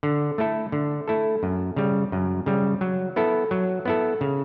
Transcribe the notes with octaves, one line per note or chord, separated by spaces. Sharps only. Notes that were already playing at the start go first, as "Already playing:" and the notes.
D3
A3 E4 A4
D3
A3 E4 A4
F#2
C#3 G3
F#2
C#3 G3
F#3
B3 E4 A4
F#3
B3 E4 A4
C#3